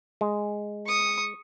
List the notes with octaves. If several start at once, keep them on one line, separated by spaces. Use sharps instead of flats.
G#3
C#6 D#6